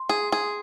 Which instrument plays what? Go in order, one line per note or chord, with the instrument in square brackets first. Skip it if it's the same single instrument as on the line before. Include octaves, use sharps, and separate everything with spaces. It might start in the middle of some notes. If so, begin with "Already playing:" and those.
Already playing: [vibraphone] C6
[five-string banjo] G#4
G#4